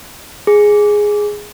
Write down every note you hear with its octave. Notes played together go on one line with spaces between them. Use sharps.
G#4